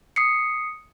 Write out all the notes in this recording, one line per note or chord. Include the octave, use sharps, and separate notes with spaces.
D#6 C7 C#7